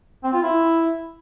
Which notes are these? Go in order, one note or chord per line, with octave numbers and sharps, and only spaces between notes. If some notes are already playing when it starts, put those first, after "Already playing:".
C4
F4
E4